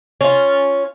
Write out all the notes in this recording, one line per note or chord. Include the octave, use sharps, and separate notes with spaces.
C#4 F4